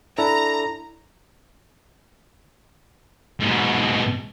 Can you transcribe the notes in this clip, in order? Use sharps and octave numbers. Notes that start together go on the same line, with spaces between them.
D4 E4 A4 A#5
G#2 B2